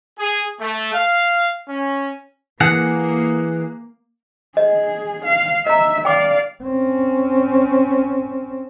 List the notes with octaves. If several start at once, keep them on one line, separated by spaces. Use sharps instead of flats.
G#4
A3
F5
C#4
E3 A#3 G#4 F#5
G#4 D#5
F5
D#5 E5 A#5
D5 F5 G5 D6
C4 C#4